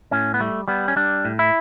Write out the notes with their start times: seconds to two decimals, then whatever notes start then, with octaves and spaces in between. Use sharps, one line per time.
0.11 A2 C#4
0.34 B3
0.40 G3 A3
0.68 G3 B3
0.88 C#4
0.96 G3 D4
1.25 A2
1.39 E4